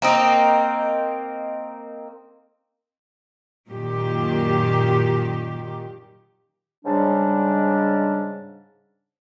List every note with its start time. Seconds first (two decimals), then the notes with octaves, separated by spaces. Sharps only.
0.02 A#3 C4 D#4
3.68 F#2 A#2 D#3 G4
6.85 G#2 C#3 G3 D4